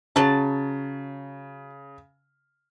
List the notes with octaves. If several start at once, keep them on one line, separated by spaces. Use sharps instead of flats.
C#3 F#3 A5